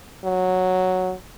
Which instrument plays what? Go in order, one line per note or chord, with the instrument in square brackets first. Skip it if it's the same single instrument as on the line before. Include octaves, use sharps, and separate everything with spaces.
[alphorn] F#3